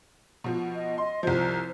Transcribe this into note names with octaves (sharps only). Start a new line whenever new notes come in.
B2 F3
D#5
D#5 C6
C2 F3 C5